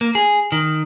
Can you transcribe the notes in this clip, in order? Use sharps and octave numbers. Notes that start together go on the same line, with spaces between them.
A#3
G#4
D#3